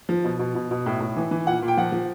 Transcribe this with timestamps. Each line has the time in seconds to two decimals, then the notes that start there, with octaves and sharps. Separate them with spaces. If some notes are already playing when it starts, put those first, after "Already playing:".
0.09 F3
0.24 B2
0.39 B2
0.55 B2
0.71 B2
0.86 A2
1.00 A2
1.16 E3
1.31 E3
1.47 A#2 F#5
1.62 A#2
1.68 G5
1.77 F3 F#5
1.92 F3